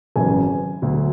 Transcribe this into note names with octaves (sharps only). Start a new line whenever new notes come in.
G#1 F#2 C#3 E3 G#5
D2 D3 F#3